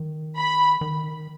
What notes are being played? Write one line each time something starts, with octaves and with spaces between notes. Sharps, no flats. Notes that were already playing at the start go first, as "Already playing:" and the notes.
Already playing: D#3
B5
D#3